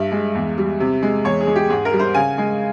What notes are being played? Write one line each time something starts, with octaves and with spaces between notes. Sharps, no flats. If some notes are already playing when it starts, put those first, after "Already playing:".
Already playing: G2 E5
G#3
E2
G3
C3
G#3
E2 C#5
G#4
G#3
G4
G#2 G#4
A#4
G3
C5
C#3 G#5
G#3